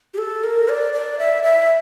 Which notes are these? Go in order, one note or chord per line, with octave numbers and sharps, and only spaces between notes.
G4
A4
A#4
D5
D5
E5
E5